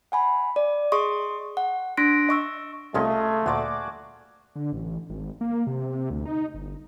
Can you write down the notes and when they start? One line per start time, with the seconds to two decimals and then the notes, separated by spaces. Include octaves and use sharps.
0.12 F#5 G#5 B5
0.56 D5
0.92 G#4 D#5 C6 C#6 D#6
1.57 F#5
1.97 D4 C6 F#6 A#6 B6 D7
2.29 D#5 C#6 E6
2.94 C2 C3 A3 C#4 F4 G#4 D#5
3.46 D2 A#2 F#4 D5 D6
4.56 D3
4.73 A1
5.10 G#1
5.41 A#3
5.67 C3
6.10 D2
6.26 D#4
6.54 G1